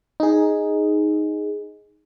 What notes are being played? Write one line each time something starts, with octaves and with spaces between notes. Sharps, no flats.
D#4 G#4